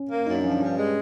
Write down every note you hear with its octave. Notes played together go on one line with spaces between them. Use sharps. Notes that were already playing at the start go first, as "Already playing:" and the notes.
Already playing: C#4
A#3
F#2 D#4
D4
F3 C#4
D4
G2 C#4
G#3